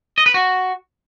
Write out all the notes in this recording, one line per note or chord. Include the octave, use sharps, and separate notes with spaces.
D#5
B4
F#4